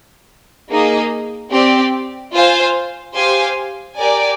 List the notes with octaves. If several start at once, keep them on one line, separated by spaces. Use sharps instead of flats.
A#3 D#4 G#4 D#5
C4 G4 D5
F4 C5 F5 G#5
G4 C5 F5 G#5
G4 A#4 D5 G#5